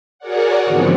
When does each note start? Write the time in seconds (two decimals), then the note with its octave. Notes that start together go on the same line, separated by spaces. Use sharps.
0.19 F#4 G#4 A#4 C#5 D5 F#5
0.65 G#2 D3 E3 F3 B3 C4